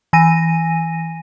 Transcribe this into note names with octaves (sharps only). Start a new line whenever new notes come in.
E3 G#5 A#6 D#7